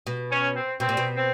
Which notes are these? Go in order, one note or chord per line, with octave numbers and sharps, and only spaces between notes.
B2
C#4
C4
B2 C4
A#2
B2
C4